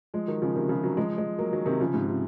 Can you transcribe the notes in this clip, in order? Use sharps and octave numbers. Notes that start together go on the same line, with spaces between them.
F3 G#3
D#3 F#3
C#3 F3
C3 D#3
C#3 F3
D#3 F#3
F3 G#3
F3 G#3
F#3 A#3
D#3 F#3
C3 D#3
C#3 F3
G#2 C3
C3